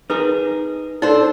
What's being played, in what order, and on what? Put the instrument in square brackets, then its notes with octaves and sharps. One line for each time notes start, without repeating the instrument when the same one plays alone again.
[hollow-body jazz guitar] D#4 G#4 A#4 [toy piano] B4
[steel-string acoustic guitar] D4 C5 [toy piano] D#4 [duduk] A4